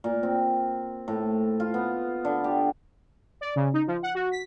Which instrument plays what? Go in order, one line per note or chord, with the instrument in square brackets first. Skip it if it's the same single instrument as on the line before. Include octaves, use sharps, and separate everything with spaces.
[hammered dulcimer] A#2
C4
A2
F4
B3
D3
G4
[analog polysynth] D5
C#3
D#4
F3
F#5
F#4
B6